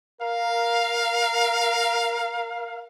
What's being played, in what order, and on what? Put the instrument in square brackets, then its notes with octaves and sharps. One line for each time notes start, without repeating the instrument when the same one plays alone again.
[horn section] A#4 F5